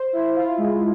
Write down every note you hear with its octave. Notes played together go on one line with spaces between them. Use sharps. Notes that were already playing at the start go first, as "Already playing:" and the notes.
Already playing: C5
E4
F4
G#3